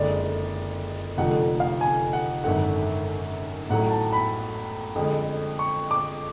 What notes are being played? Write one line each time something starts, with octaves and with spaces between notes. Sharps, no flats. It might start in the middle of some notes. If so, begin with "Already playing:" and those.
Already playing: F#1 F2 D3 G#3 D5
F1 F2 D3 F3 A3 F#5
F5
G#5
F#5
G#1 F#2 D3 F#5
A1 A2 F#3 A3 F#5
A5
B5
F2 D3 G#3
C#6
D6